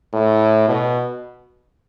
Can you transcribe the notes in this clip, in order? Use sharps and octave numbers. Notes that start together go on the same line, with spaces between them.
A2
B2